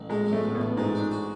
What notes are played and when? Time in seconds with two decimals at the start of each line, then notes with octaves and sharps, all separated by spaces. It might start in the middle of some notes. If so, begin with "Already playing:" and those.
Already playing: A1
0.10 A2 G#3
0.27 F#3
0.33 A3
0.43 A1
0.55 B2
0.61 A1
0.77 G#2 A3
0.95 D4
1.11 F#4